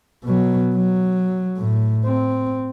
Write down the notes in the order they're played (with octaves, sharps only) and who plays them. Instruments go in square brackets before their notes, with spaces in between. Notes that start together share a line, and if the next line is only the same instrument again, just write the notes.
[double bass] B2 F#3
F#3
A2
C4